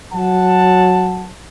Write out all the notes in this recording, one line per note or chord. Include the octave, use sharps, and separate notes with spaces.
F#3 F#5 A5